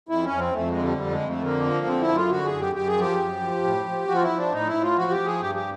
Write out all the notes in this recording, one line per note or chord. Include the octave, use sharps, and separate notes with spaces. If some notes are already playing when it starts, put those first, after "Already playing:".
F2 E4
C#4
F2
C4
F2 A3
G#3
D3
G3
F2 G3
G#3
F2
A3
D3 A#3
F3
D3 C4
E4
F#2
F4
D3 F#4
G#4
F#2
G4
F#2 G4
G#4
F3 G4
F#2
F3
A2
F3
F3 F#4
F4
E4
F3
D4
A2 D#4
E4
A2
F4
F3 F#4
G4
F3
G#4
G2 G4
G4